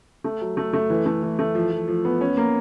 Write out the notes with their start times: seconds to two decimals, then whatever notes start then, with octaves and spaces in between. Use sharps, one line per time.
0.24 A3
0.41 F#3
0.57 A3
0.73 A3
0.90 E3
1.06 A3
1.23 E3
1.39 A3
1.55 F3
1.71 F3
1.88 F3
2.05 B3
2.21 C#4
2.37 A#3